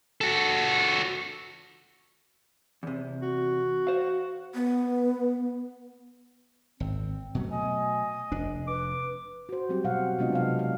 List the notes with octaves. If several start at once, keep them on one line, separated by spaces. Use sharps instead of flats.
F#4 A4
E2 C3
F#4
C5 F5
B3
G#1 C4
B2 F#3 A3
D#5 G#5
F1 D4
B4 D6
F#4 C5
F#3 G3 C4 F#4 G4
B2 F5 F#5
C3 G#3 B3 D4 F4 D#5
F#3 F5
F5